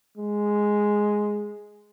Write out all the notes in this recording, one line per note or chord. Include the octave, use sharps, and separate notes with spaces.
G#3